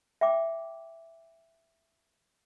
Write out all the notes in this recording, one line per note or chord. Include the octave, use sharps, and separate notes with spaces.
E5 G5 D6